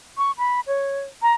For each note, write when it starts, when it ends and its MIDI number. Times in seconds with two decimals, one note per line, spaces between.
0.18 0.31 85
0.38 0.60 83
0.67 1.01 73
1.22 1.33 82